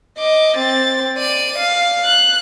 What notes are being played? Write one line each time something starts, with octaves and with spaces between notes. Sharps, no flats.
D#5 D6
C4 A6
D5 D#7
F5
F#6